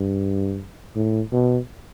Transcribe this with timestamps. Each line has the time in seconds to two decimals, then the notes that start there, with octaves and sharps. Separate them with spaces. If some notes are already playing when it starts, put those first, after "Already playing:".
Already playing: G2
0.96 A2
1.32 B2